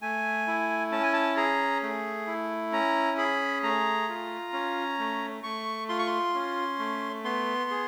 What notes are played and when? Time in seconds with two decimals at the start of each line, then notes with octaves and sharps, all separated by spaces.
0.02 A3 G#5
0.47 E4
0.92 C#4 A5
1.03 G#5
1.13 A5
1.36 G#4 A#5
1.82 A3
2.27 E4
2.72 C#4 A#5
3.18 G#4 B5
3.63 A3 A#5
4.09 F4
4.53 C#4
4.99 A3
5.43 A3 C#6
5.89 F4 C6
5.99 C#6
6.06 C6
6.34 C#4
6.79 A3
7.24 B3 C6
7.70 G#4